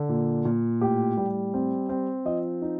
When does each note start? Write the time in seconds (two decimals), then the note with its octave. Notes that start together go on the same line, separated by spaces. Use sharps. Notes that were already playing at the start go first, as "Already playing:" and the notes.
Already playing: D3
0.09 A#2
0.45 A#2
0.81 A2 G4
1.17 G3
1.54 C4
1.89 C4
2.25 F3 D#5
2.62 D#4